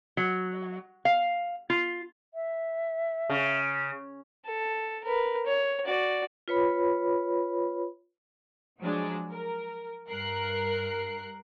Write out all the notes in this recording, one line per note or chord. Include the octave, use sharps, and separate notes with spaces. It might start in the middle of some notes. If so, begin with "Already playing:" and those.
F#3
F5
F4
E5
C#3
A4
A#4 B4
C#5
F#4 D5
F4 B4 C#5 B5
F3 F#3 G#3 D4
A#4
G2 A#4 F#6 C7